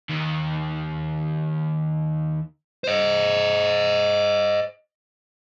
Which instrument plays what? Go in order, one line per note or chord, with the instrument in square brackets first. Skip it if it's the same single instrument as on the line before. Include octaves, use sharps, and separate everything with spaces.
[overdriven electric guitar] D#2 D#3
[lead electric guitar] C5 D#5